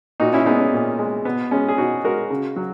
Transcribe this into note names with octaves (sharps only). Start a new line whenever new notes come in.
A#2 D#4 F#4
C#4 E4
G#3 B3 D#4
C#4
A#2
G#3
B2 B3
G#3 C#4
G#4
B2 D#4 F#4
G#3 F#4 A#4
C#3
F#3